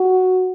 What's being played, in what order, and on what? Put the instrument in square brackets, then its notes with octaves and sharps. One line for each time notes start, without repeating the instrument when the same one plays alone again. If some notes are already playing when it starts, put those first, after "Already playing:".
Already playing: [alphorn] F#4